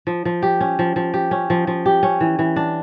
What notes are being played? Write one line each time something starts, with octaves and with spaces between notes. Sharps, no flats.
F3
F3
G4
C#4
F3
F3
G4
C#4
F3
F3
G4
C#4
E3
E3
D4